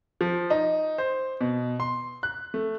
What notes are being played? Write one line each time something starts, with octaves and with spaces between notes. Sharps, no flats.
F3
D#4
C5
B2
C6
F#6
A3